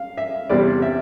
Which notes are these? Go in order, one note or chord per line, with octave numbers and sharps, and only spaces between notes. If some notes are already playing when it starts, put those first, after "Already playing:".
Already playing: F5
E5
E2 C3 G3 C4 D5
E5